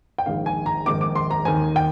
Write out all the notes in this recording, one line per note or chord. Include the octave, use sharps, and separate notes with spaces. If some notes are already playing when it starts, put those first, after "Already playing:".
G5
A#1 G#2 D#3 F5
G#5
A#5
A#1 G#2 D#3 D6
D6
C6
A#5
D#2 D#3 G#5
G5